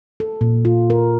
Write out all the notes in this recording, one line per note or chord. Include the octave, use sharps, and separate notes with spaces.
A4
A#2
F4
A#4